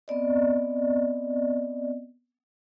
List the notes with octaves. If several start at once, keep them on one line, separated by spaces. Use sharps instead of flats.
B3 C4 D5 D#5